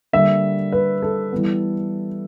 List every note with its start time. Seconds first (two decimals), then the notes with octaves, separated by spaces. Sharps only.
0.13 D3 G3 A#3 E5
0.72 B4
1.02 A4
1.32 E3 G3 B3